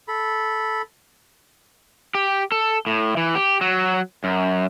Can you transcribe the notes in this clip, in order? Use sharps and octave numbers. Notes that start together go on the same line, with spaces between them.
A4 B5
G4
A4
A2
E3
G4
F#3
F#2